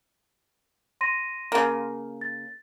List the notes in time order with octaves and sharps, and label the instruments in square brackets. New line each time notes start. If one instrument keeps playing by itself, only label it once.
[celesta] C6 A#6 D#7
[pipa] C#3 A#3
[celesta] A6